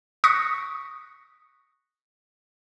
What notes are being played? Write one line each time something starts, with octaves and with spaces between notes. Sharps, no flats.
C#6 D#6 F#6 A#6 B6 C#7